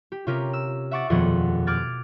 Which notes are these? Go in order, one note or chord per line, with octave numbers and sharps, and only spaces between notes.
G4
C3 C#4 F4 G4 A#4
E6
E5 F#5 C#6 D6 A6
D#1 F2 B2 F3 G#4 F#5
D6 F6 F#6 G#6 A6